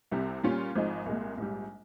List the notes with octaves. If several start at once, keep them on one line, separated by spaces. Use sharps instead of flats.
C2 C3 G3
A#2 G3 C#4 F4
G#1 G#2 F3 G#3 D#4
C2 A#2 G#3
A#1 G#2 G3